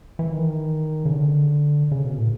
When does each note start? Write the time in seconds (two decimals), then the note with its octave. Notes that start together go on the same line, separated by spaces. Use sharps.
0.19 E3
0.32 D#3
1.05 C#3
1.12 D3
1.92 C#3
2.05 B2
2.18 A2